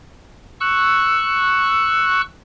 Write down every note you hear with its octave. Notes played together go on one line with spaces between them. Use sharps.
C#6 E6 F#6